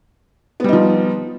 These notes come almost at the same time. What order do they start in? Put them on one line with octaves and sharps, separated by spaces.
B3 G3 D#4 F3